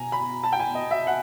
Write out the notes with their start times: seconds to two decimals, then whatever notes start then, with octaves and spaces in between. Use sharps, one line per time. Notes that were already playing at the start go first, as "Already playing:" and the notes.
Already playing: B2 G#5 A#5
0.12 B5
0.43 A5
0.53 G5
0.59 G#5
0.75 D#5
0.91 E5
1.07 F#5